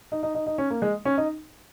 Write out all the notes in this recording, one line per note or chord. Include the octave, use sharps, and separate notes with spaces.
D#4
D#4
D#4
D#4
C#4
A#3
G#3
C#4
D#4